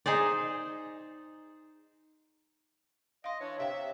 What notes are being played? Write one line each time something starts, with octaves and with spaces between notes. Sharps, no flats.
D#4 G#4 C5 D5
D#5 F5 C6
E3 D4 C#5
C3 C#5 E5 F5 G5